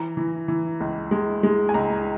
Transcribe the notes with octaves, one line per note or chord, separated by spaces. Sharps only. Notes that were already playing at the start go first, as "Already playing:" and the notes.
Already playing: E3 A#5
E3
E3
C#2
G#3
G#3
G#5
C#2 A#5